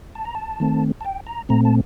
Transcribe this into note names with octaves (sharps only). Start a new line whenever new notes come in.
A5
A#5
A5
D#3 A3 C4
A5
G5
A#5
A#2 A3 C4 A#5
A5